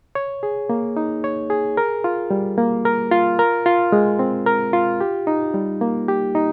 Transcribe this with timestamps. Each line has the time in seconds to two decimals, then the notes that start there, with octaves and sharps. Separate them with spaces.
0.15 C#5
0.43 G#4
0.70 A#3
0.97 D#4
1.24 C#5
1.50 G#4
1.77 A#4
2.04 F4
2.31 G3
2.58 A#3
2.85 A#4
3.11 F4
3.39 A#4
3.66 F4
3.92 G#3
4.19 C4
4.46 A#4
4.73 F4
5.01 G4
5.27 D#4
5.54 G3
5.81 A#3
6.08 G4
6.35 D#4